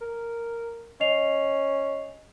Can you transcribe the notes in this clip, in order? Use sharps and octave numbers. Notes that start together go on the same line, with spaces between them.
A#4
C#4 D#5 C7 F7